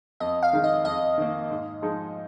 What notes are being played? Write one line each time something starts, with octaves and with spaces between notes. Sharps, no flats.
F2 D#5
F5
D#3 G#3 D#4
D#5
F2 D#5
D#3 A#3
G#2
F3 G#3 D#4